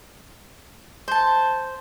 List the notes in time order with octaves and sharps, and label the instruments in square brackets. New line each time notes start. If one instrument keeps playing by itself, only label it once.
[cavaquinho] C5 A5